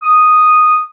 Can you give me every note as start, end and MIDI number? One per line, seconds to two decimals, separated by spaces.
0.03 0.81 87